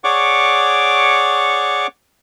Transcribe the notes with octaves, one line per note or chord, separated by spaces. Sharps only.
G#4 C#5 D5 F#5 C#6 D6